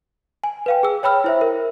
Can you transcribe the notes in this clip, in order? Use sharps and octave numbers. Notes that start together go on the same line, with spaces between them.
G#5
B4 F5 G5
G#4 E6
C#5 G5 B5 E6 F6
E4 C5 E5
A#4